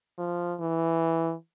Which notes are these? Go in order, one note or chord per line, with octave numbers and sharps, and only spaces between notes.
F3
E3